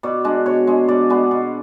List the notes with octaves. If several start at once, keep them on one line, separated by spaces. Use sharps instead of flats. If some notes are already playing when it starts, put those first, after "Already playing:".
B2 D5
G#3 D4
B2 C#5
G#3 D4
B2 D5
G#3 B3 D4
B2